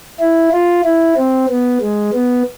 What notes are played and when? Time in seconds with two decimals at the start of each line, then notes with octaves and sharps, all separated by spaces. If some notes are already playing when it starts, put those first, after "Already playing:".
0.20 E4
0.52 F4
0.84 E4
1.17 C4
1.49 B3
1.81 G#3
2.14 B3